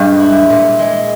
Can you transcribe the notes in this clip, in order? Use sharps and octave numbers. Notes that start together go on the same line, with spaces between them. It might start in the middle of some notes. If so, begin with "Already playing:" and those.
Already playing: G2 A#2 G#3 G4
E4
A#2
G#3